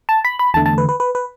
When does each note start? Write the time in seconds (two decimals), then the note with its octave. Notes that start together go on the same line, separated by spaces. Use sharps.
0.09 A5
0.25 B5
0.39 B5
0.54 E2 D3 A3 A5
0.66 A5
0.78 B4
0.89 B4
1.00 B4
1.15 B4